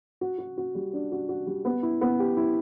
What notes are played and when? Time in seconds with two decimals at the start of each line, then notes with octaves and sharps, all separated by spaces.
0.21 F#4
0.38 F#4
0.58 F#4
0.75 G3
0.93 D4
1.12 F#4
1.29 F#4
1.47 G3
1.65 B3
1.83 E4
2.01 B3
2.19 G4
2.37 E4